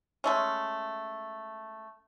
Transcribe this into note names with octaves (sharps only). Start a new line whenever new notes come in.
G#3 A3 C#4